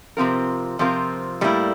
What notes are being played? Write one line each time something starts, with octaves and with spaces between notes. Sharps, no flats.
C3 F3 C4 F4 A#4
C3 F3 C4 F4 A#4
A2 G3 A#3 E4